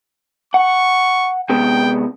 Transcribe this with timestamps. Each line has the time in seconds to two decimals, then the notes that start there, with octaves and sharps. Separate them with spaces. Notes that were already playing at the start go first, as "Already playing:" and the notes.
0.54 F#5 C#6
1.49 C3 G#3 B3 G5